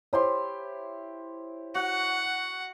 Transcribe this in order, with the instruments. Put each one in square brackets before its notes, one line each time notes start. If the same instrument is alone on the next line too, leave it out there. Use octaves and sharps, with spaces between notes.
[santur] E4 G4 C6 [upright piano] C5 C#5
[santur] F#4 [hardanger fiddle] F#5